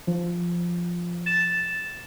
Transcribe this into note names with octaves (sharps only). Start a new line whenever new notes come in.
F3
A6 E7